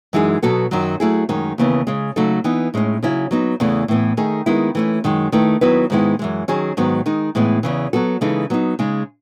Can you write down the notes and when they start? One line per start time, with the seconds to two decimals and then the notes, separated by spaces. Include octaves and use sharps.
0.13 F#2 E3 G#3 D#4 G#4
0.42 B2 F#3 B3 F#4 A4
0.71 F#2 D#3 F#3
1.00 F#3 A3 E4 G#4
1.29 F#2 D#3 G#3 C#4
1.58 D#2 C#3 E3 B3
1.87 C#3 G#3 C#4
2.16 C#3 F#3 A3 D#4 A4
2.44 E3 B3 D#4
2.74 A2 G#3 C#4
3.03 C#3 F#3 C#4 E4
3.31 F#3 B3 D#4
3.60 E2 C#3 E3 A3
3.88 A2 E3 B3
4.17 D#3 A3 D#4 G#4
4.46 D#3 G#3 B3 E4
4.75 E3 A3 C#4
5.04 F#2 D#3 G#3
5.32 D#3 A3 E4 B4
5.61 D#3 F#3 B3 E4 B4
5.90 G#2 D#3 G#3 B3 E4
6.19 F#2 E3 G#3
6.48 D#3 F#3 C#4 G#4
6.77 G#2 D#3 F#3 B3
7.06 D#3 G#3 D#4
7.35 A2 E3 G#3 B3
7.63 E2 C#3 E3
7.93 F#3 B3 F#4 A4
8.21 C#3 E3 G#3 D#4 A4
8.50 F#3 B3 D#4
8.79 C#3 G#3 D#4